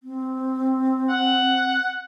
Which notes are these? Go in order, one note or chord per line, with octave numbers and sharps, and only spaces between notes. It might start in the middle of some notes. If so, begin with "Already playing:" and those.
C4
F#5